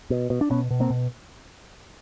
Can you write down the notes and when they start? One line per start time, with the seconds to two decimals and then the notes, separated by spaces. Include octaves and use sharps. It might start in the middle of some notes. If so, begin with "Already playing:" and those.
0.10 B2
0.30 B2
0.41 D4
0.50 B2 B3 C#4
0.71 B2
0.80 A#3 C4
0.90 B2